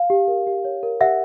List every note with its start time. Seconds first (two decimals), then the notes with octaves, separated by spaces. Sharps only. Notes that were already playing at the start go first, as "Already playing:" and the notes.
Already playing: F5
0.10 G4
0.28 A#4
0.47 G4
0.65 C#5
0.83 A#4
1.01 G4 E5 F#5